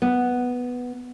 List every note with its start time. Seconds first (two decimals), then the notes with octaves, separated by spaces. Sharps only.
0.02 B3